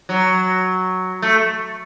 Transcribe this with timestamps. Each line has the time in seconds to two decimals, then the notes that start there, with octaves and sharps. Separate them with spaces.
0.09 F#3
1.22 A3